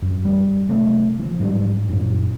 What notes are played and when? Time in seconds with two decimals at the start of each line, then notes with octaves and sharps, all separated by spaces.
0.02 F#2
0.25 G3
0.69 C3 F#3 A3 A#3
1.19 E3 F3
1.40 G#2 F#3 G3 D4
1.89 F#2 A#2